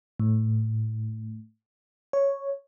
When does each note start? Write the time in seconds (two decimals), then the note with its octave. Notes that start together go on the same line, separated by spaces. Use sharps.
0.20 A2
2.13 C#5